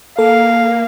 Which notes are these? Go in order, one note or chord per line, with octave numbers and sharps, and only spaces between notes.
A#3 A4 F5